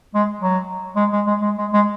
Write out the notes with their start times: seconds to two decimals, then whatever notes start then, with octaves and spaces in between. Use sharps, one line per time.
0.15 G#3
0.41 F#3
0.96 G#3
1.12 G#3
1.26 G#3
1.42 G#3
1.58 G#3
1.73 G#3